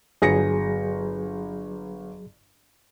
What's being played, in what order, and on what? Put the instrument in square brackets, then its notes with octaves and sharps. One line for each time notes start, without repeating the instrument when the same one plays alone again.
[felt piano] G1 A#6 C#7 [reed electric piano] F#3 G#4